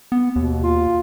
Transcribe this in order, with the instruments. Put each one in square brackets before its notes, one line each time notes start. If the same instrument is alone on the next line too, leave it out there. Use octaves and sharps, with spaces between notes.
[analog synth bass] B3
[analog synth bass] D#2 [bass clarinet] B2
[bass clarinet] F4